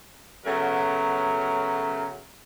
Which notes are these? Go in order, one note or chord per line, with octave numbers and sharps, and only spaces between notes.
C#3 F#3 A3 B3 A#4